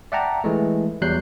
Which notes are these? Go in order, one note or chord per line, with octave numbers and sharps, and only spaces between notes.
D5 E5 F#5 G5 A5 A#5
E3 G#3 A3
E2 F#3 G3 F#6 G6 C7